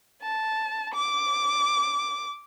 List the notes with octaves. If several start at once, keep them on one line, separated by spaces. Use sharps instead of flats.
A5
D6